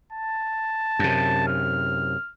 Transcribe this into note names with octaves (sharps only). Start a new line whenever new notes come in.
A5
F#2 C3
F6